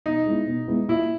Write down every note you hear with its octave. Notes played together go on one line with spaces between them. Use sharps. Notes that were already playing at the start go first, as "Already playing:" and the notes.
B2 D#4
G#3 B3 E4
B2
G#3 B3 E4
A#2 E4